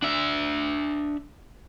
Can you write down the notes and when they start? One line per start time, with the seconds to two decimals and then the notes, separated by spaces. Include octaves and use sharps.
0.02 D4 E5